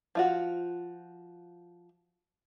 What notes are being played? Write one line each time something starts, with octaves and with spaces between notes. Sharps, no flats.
F3 F4 F#4